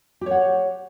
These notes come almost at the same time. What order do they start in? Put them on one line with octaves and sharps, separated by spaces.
G4 C#5 F#5